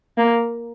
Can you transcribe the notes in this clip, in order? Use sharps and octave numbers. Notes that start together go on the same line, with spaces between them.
A#3